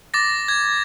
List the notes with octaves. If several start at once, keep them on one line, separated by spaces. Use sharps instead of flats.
D6 A6 A#6
G#6